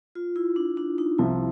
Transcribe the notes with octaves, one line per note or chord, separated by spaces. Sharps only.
F4
E4
D4
D4
D#4
C2 C3 F3 E4